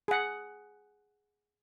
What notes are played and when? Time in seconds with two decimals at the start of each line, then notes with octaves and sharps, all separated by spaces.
0.08 G#4 F#5